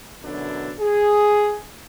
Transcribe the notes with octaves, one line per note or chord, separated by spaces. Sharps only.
F#2 B2 D3 F#3 D4 E4
G#4